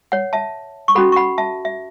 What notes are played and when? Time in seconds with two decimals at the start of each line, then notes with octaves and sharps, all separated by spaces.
0.12 C#5 F#5
0.33 E5 A5
0.88 C#6
0.95 C#4 F#4 A4 F#5 B5
1.12 C#6
1.16 F#5 B5
1.38 E5 A5
1.65 E5